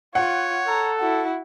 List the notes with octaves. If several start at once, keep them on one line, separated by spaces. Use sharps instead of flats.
F4 C#5 F#5
A4 A#5
E4 F#4